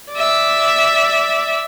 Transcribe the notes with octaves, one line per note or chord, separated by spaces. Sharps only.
D5 E5